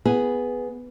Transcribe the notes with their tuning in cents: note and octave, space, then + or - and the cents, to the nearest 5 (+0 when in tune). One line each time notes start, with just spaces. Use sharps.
B3 +0 G#4 +0